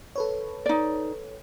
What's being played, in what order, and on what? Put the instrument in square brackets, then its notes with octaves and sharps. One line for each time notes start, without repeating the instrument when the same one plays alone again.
[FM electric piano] A4 B4 C#5
[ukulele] D#4 D5